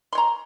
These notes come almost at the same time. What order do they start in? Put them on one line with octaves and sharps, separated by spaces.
C6 C#5 A#5